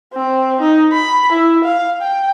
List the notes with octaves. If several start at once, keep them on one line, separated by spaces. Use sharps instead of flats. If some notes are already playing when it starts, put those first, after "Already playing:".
C4
D#4
B5
E4
F5
G5